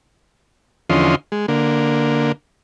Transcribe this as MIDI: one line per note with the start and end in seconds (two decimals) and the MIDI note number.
0.90 1.15 40
0.90 1.15 50
0.90 1.15 53
0.90 1.15 61
0.90 1.15 75
0.90 1.15 84
1.32 1.46 56
1.48 2.32 50
1.48 2.32 58